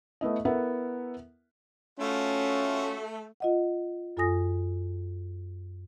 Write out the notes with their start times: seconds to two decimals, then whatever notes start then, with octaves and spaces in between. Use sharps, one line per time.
0.21 A3 B3 E4 D#5
0.45 B3 E4 A4 A#4 E5 F#5
1.99 A3 C#4 F4 F#4
3.40 F4 D#5 F#5
4.17 F#2 F4 A4 G#5 D#6 A#6